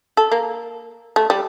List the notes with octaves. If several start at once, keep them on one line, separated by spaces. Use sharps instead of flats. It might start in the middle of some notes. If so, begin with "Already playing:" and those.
A4
A#3
A3
G3